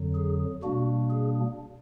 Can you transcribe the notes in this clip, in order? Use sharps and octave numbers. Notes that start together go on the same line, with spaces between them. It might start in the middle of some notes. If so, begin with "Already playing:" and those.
Already playing: F2 D3 F#3
G#4
B2 G3 A#3 D4 F#4
G#4